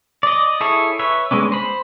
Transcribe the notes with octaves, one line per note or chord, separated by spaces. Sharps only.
D5 D#5
E4 G#4 A4 C#5
B4 C#5 E5
G#3 B3 C#4 D4
C5 B5